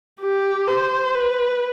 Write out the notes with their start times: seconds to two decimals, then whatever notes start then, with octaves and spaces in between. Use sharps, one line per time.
0.21 G4
0.68 C5
1.14 B4